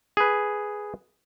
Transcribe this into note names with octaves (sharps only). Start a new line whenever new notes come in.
G#4 B4